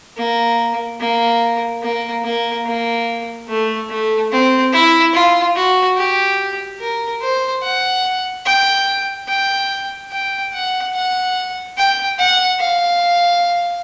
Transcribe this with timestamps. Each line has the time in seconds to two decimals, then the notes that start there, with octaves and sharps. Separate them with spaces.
0.17 A#3
1.00 A#3
1.82 A#3
2.24 A#3
2.66 A#3
3.48 A3
3.89 A3
4.31 C4
4.73 E4
5.14 F4
5.56 F#4
5.97 G4
6.80 A#4
7.21 C5
7.63 F#5
8.46 G5
9.28 G5
10.11 G5
10.53 F#5
10.95 F#5
11.77 G5
12.18 F#5
12.60 F5